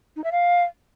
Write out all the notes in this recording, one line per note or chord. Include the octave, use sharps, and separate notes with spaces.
D#4
E5
F5